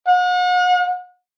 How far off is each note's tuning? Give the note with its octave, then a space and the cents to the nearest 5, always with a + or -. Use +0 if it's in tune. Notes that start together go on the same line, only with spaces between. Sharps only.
F#5 -40